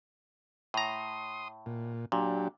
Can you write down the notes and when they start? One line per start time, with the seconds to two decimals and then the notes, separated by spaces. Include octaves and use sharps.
0.74 A2 A#5 C6 D#6
1.66 A#2
2.12 A#2 F#3 D4 G4